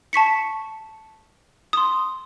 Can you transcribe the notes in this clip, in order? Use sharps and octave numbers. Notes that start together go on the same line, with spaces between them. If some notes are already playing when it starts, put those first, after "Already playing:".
A5 C#6 B6 C#7
C6 D#6